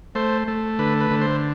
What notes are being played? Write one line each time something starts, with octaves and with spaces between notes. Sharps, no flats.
A3 C5
A3
D3 B4
B4
D3
C5